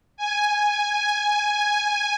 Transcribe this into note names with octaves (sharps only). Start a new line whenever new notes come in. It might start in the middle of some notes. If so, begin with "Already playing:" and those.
G#5
G#5
G#5